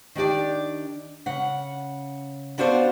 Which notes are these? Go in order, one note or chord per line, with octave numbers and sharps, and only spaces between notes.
D#3 D4 G4 D5
C#3 F#5
B3 D4 F#4 C5 E5 F5